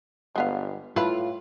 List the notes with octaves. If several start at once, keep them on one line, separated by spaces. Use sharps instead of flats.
G1 G#3 B3 F5
A2 E4 F4 A4 B4